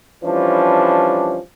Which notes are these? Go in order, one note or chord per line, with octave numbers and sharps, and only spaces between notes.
E3 F3 G3 C#4 D4